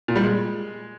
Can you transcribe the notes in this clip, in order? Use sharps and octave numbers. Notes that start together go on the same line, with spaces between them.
A#2
G3
G#3